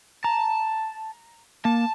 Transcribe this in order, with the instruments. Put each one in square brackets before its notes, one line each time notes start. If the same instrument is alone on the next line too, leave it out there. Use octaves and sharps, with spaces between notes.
[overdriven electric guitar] A5 [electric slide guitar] A#5
[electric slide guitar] A#3 [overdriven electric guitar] A5